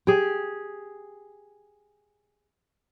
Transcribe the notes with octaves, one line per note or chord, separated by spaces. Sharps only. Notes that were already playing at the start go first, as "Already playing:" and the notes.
G4 G#4